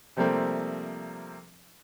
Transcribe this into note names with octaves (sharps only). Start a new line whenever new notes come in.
C3 F3 G3 A3 A#3 C4